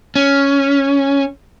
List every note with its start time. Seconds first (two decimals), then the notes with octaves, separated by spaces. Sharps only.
0.16 C#4